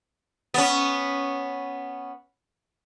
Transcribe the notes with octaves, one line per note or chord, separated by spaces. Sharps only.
B3 C#4